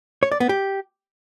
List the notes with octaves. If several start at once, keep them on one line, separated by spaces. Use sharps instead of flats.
C#5
D5
B3
G4